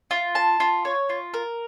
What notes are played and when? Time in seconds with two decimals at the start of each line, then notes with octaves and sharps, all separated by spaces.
0.11 F4
0.35 A5
0.60 F4
0.85 C#5
1.09 F4
1.34 A#4